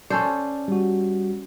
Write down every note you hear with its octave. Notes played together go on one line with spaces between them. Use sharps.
C#4 A4 C5 D5
G3 F#4